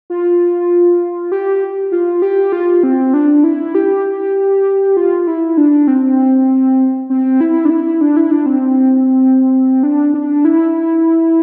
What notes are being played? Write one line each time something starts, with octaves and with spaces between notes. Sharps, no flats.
F4
G4
F4
G4
F4
C4
D4
E4
G4
F4
E4
D4
C4
C4
E4
D4
E4
D4
E4
D4
C4
D4
D4
E4